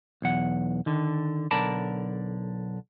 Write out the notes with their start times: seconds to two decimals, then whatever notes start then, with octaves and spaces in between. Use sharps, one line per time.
0.22 B1 E2 F#5
0.86 D3 D#3
1.51 B1 D3 A#4 D5 A5 B5